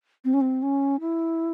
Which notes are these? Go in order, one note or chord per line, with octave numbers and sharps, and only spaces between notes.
C4
C#4
C4
C#4
E4